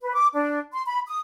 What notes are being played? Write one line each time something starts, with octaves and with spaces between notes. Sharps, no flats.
B4
D6
D4
C6
B5
D#6